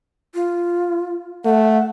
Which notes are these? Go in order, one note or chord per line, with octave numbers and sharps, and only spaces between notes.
F4
A3 F#5